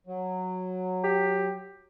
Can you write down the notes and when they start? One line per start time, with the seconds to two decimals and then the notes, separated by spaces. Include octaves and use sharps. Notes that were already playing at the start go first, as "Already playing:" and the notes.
0.07 F#3
1.04 G4